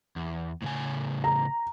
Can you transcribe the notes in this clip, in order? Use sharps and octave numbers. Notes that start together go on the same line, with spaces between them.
E2
A2 C#3 G#5
A#5